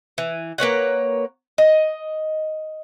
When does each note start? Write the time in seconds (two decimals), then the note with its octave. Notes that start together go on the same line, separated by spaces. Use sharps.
0.18 E3
0.58 A#3 B4 C#5 F#5
1.58 D#5